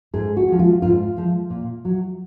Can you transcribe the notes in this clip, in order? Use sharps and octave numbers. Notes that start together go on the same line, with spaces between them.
G#2 G#4
F#4
F3 G#3
F4
G#2 F4
F3 G#3
A#2
F#3